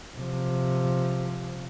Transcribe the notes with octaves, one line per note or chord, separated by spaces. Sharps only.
C3 F3